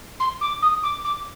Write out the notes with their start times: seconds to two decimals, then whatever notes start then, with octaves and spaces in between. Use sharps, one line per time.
0.20 C6
0.41 D6
0.62 D#6
0.83 D6
1.04 D6